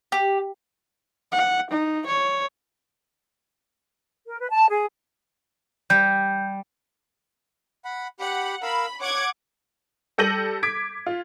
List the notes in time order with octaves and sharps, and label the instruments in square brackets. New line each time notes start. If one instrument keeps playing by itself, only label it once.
[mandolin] G4
[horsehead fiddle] F#5
D#4
C#5
[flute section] A#4
B4
A5
G#4
[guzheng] G3 [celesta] G6
[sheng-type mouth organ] F#5 B5
[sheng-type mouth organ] G4 B5 [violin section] F#5
[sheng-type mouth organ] A#4 F5 E6 [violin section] B5
[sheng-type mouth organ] C#5 [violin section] F#5 D6 G#6
[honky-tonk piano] G3 A4 G6 A#6 D#7 F#7
D6 G#6 B6 D7
F4